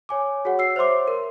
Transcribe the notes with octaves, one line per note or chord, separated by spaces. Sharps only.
C#5 G#5 D6
F#4 G#4 C#5 F#5
E6 C7
C5 C#5 E5 C6 D6
A#4